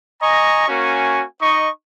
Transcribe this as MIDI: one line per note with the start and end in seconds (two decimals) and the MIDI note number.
0.21 0.67 75
0.21 0.67 80
0.21 0.67 82
0.21 0.67 85
0.68 1.23 58
0.68 1.23 61
0.68 1.23 66
0.68 1.23 80
1.41 1.68 63
1.41 1.68 75
1.41 1.68 85